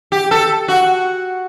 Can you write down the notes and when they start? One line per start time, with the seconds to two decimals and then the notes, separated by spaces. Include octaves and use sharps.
0.12 G4
0.31 A4
0.68 F#4